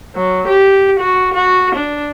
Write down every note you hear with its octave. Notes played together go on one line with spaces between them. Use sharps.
F#3
G4
F#4
F#4
D4